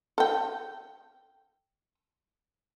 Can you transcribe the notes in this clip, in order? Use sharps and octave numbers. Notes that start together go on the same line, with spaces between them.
A4 G5